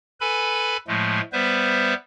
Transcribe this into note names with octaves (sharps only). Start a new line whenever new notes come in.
A4 B4 G#5 B5
A2 F3 G#3 A3
G3 B3 B4 C5 E5